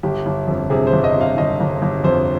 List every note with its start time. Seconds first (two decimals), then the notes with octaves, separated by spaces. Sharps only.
0.03 G1 G4
0.26 G1
0.47 F2
0.70 C3 G#4
0.87 C5
0.93 G1
1.04 D#5
1.16 C3
1.21 F5
1.37 G1 D#5
1.60 G1
1.82 G1
2.04 F2 C5